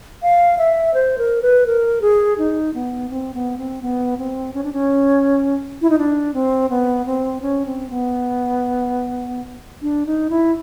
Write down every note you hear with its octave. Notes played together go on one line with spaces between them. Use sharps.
F5
E5
C5
A#4
B4
A#4
G#4
D#4
B3
C4
B3
C4
B3
C4
C#4
D4
C#4
E4
D#4
D4
C4
B3
C4
C#4
C4
B3
D4
D#4
E4